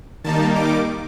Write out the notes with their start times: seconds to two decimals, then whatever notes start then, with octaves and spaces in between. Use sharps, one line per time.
0.24 D#3 G3 A#3 D#4 A5
0.56 D6